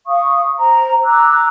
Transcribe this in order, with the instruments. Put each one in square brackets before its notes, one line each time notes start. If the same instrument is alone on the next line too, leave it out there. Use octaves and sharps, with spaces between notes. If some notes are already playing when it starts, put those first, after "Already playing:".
[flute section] F5 C#6 D#6
C5 A#5
A#5 D6 E6 F#6